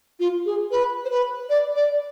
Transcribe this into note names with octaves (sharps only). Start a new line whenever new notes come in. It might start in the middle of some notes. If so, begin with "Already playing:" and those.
F4
G#4
B4
C5
B4
D5
D5